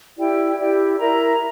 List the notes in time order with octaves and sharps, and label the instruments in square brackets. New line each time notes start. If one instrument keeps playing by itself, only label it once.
[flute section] E4 G4 D5 G5
E4 G4 D5 G5
E4 A#4 E5 A#5